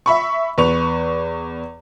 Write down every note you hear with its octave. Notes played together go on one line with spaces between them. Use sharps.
E5 B5 C#6
E2 B4 C#6 F7